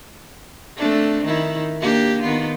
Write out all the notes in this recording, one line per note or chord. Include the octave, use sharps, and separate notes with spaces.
A3 C4 D4
D#3 E4
A#3 D4 G4
D#3 B3 F4